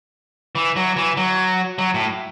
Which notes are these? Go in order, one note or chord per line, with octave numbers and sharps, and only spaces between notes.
E3
F#3
E3
F#3
F#3
A2